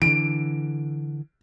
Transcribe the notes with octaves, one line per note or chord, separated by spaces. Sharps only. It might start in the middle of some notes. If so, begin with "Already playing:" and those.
D3 E3 D7